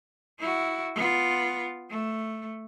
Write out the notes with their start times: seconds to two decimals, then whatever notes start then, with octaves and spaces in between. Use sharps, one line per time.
0.39 E4 F#4
0.95 B3 F4
1.90 A3